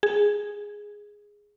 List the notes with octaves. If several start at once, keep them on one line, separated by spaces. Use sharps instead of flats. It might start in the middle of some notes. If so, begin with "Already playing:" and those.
G#4